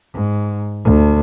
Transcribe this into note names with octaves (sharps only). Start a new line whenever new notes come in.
G#2
D2